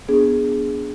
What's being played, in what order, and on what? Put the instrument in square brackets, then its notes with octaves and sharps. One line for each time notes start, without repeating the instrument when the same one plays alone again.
[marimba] B3 D4 G#4